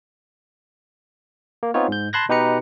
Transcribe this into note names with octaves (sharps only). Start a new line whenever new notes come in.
A#3
B3 C4 D#4 F4 C#5
G#2 G6
A5 B5 C6 F#6 G#6 A#6
B2 D#4 G4 B4 A#5 C#7